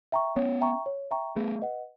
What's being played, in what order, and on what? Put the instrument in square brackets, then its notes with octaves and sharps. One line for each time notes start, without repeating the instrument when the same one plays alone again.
[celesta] E5 G5 A#5 C#6
[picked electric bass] B3 C#4 [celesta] C#5
[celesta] E5 G5 A#5 C#6
C#5
E5 G5 A#5 C#6
[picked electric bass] A3 B3 [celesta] G#4
[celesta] B4 D#5 F#5